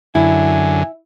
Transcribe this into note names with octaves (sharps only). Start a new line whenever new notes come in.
F#2 D3 E4 G#5